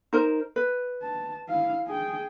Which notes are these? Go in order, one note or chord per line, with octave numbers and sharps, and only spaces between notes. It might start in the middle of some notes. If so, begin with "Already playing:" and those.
D#4 A#4 C5
B4
A5
E4 F5
G#4 G5